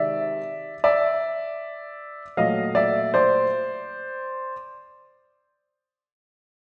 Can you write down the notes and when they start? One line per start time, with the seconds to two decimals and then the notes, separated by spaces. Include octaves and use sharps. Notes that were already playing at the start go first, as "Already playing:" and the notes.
Already playing: C3 D#3 G#3 D5 E5
0.84 D5 E5
2.37 A#2 F#3 A3 D#5 F5
2.75 D5 E5
3.14 C5 D5